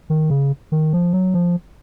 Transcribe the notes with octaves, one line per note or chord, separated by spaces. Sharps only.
D#3
C#3
D#3
F3
F#3
F3